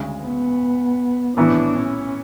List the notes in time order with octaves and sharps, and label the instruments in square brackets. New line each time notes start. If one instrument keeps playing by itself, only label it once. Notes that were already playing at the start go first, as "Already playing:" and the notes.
Already playing: [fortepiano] D2 C#3 G#3
[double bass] B3
[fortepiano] A2 E3 B3 E4 [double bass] D4
[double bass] C#4